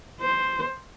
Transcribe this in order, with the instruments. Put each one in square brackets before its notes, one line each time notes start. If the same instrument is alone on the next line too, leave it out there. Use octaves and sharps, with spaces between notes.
[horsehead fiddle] C5